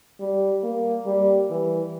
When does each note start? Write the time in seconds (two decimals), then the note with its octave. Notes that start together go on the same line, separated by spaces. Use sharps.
0.20 G3
0.63 A#3
1.06 G3
1.50 E3